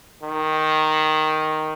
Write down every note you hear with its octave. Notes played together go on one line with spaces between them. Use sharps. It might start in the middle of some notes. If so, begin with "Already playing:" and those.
D#3